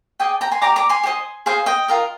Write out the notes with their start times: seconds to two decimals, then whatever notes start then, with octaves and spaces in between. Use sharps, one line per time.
0.20 G#4 D5 D#5 G5
0.41 G5 A#5
0.52 G#5 C6
0.61 G4 D5 A#5 D6
0.76 A#5 D6
0.89 G#5 C6
1.03 G4 C5 D#5
1.46 G#4 C5 D#5 F5
1.66 D#5 G5
1.88 F4 A#4 D#5